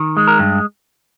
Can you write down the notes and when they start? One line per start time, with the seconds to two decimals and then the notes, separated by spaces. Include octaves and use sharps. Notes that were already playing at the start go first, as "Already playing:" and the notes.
Already playing: D#3
0.17 G#3
0.27 A#4
0.39 G2